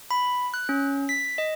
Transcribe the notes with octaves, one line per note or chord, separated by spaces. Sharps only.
B5
F#6
C#4
B6
D#5